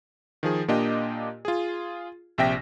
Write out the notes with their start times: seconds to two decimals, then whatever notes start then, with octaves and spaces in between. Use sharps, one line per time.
0.43 D#3 F3 G#4
0.68 A#2 A#3 D4 F4 G4 D#5
1.45 F4 G#4
2.38 A#1 C3 E5 G5 A#6 B6